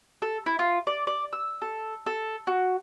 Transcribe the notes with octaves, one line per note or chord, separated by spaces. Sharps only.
A4
E4
F4
D5
D5
E6
A4
A4
F#4